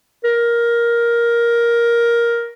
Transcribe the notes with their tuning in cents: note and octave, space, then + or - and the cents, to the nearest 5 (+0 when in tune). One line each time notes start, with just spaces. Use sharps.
A#4 +10